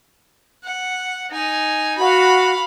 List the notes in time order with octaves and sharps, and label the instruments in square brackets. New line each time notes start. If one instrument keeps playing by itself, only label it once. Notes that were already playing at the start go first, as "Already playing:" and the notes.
[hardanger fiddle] F#5
D#4 G#5
[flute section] F#4 [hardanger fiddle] F5 B5